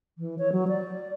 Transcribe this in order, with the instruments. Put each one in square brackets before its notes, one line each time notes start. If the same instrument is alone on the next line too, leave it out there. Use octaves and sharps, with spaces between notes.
[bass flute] E3
C#5
F#3
D5